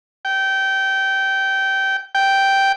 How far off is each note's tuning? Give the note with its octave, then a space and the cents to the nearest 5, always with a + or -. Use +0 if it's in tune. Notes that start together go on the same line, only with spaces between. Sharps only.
G5 -20
G5 -5